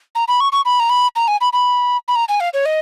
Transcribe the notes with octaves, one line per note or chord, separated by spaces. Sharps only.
A#5
B5
C#6
C#6
B5
A#5
B5
A#5
G#5
B5
B5
B5
A#5
G#5
F5
C#5
D#5